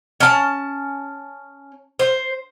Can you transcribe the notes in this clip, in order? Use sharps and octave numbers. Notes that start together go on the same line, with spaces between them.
C#4 A5
C5